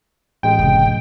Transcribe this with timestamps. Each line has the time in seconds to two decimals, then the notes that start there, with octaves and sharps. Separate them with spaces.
0.43 A1 G#3 G5
0.59 F#1 C3
0.85 B3